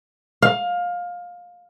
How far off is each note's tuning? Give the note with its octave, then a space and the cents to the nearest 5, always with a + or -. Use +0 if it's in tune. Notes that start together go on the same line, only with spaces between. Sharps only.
F5 +20